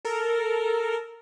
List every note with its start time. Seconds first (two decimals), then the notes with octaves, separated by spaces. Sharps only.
0.05 A4 A#4